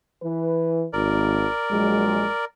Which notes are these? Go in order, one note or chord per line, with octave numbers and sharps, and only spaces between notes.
E3 B4
G#1 A#4 D5
A#1 F#3 G#3